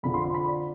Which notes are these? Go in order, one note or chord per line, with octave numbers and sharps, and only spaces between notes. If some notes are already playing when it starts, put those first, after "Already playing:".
F2 D3 F3 B5
C6
C6
B5
D5